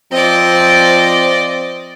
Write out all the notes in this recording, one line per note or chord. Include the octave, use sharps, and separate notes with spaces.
F3 C4 D5 D#5